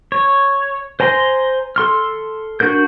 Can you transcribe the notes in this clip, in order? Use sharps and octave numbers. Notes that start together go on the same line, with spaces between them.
C#5
C5 G#5 A#5 C6
A4 C6 F6
D4 F#4 A#4 G6